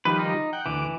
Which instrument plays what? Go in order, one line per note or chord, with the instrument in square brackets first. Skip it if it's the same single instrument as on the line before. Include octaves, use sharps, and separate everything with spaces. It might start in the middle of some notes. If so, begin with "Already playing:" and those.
[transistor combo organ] D#3 F3 G3 [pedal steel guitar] B4
[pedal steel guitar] D#4
[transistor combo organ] F#5 G5
[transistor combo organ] D2 D6 [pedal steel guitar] E3